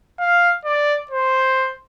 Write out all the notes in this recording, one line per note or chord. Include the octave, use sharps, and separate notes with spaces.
F5
D5
C5